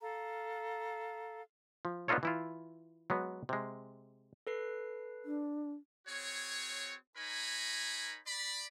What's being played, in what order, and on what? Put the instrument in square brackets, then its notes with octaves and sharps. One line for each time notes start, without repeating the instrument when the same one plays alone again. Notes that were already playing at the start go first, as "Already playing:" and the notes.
[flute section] A4 F5 A#5
[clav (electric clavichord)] F3
B3 D4 D#4 F4 A4 C#5
E3 E4 F4
F#3 G#3 B3
C3 G#3
[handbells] A4 B4 C7
[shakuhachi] D4
[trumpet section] C4 F#4 G#4 C#5
D#4 A#4 C#5 G#5 A#5 B5
D5 B5